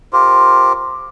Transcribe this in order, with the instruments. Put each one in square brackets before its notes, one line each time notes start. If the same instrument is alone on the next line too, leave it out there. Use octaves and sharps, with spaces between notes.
[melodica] F4 G4 A#4 C5